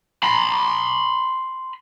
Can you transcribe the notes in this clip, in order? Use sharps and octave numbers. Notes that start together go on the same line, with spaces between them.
B5 C6